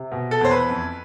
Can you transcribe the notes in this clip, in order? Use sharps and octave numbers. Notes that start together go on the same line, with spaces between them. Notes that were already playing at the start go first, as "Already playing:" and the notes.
Already playing: C3
B2
A4
E2 C5
B4
F2